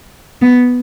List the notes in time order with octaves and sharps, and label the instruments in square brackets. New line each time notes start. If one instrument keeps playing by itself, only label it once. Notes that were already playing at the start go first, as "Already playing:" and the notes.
[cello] B3